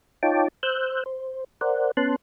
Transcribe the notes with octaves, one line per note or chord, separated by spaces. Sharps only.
D#4 F4 C#5 G5 A5 D6
C5 E6 F#6 G6
C5
A#4 C5 D5 F#5
B3 C#4 A5 C6 F#6